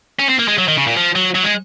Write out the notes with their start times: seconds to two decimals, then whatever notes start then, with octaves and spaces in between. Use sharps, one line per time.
0.20 C#4
0.29 C4
0.39 A#3
0.48 G#3
0.58 F#3
0.68 D#3
0.77 C#3
0.87 A#2
0.97 F3
1.16 F#3
1.35 F#3
1.44 G#3